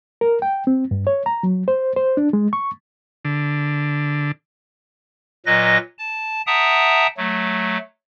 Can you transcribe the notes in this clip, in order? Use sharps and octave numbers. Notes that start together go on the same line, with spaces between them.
A#4
G5
C4
G2
C#5
A#5
F#3
C5
C5
D4
G#3
C#6
D3
A#2 F#3 B4 D#5 A#6
A5
E5 F#5 G5 A5 A#5 D#6
F#3 A3